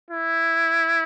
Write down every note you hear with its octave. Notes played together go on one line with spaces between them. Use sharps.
E4